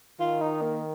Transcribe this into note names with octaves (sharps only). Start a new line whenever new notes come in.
D#3 F4
D#4
A#3